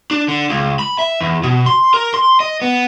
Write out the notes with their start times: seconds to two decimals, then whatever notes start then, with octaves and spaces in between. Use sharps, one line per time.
0.11 D4
0.28 D3
0.49 C#2
0.79 B5
0.99 E5
1.20 E2
1.43 B2
1.66 C6
1.94 A#4
2.14 C6
2.40 D#5
2.62 B3